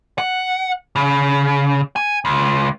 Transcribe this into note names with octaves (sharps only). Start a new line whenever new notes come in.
F#5
C#3
G#5
C#2